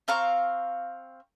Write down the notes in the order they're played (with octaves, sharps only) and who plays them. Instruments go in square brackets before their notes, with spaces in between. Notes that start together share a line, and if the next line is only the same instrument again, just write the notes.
[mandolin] C4 F5 A#5 C#6